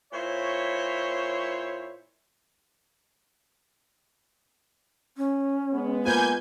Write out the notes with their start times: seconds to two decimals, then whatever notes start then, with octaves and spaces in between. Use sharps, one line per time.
0.12 A#2 E4 C5 C#5
5.17 C#4
5.73 G#3 B3
6.05 A#3 F4 B4 G#5 G6 G#6